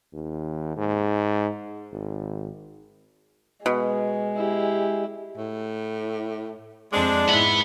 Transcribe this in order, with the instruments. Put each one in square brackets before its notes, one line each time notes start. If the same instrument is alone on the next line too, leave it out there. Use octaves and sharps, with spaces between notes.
[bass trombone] D#2
G#2
G#1
[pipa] B2 [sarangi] G#3
[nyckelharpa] E4 G4
[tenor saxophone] A2
[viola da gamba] F2 C4 [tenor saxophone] G#3 [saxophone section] D4
[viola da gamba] G#2 E4 [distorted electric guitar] B4 F#5